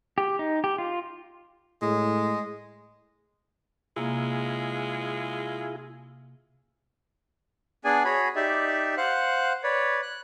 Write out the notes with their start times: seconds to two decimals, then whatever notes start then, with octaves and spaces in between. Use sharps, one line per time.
0.18 G4
0.39 D#4
0.64 G4
0.78 F4
1.82 A2 G#3
3.96 C3 G#3 A#3 E4 F4 G#4
7.85 B3 D4 G#4 D5 G#5
8.05 F#4 G#4 C#5 B5
8.36 D#4 G4 D5 E5
8.97 C5 F5 F#5 F#6
9.63 B4 C#5 D5
10.03 F#6